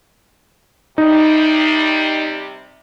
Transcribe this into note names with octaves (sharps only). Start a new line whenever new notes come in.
C3 G3 D#4